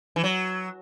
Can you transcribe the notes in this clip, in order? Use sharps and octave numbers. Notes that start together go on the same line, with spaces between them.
E3
F#3